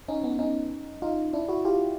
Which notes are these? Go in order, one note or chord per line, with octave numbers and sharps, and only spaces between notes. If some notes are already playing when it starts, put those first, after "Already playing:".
C#4 D#4
B3 C#4
C#4 D#4
D#4 F4
D4 E4
E4 F#4
F4 G4